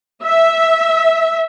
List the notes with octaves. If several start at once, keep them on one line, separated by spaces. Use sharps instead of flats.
E5